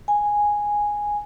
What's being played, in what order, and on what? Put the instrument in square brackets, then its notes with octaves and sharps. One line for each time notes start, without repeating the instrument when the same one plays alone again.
[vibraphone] G#5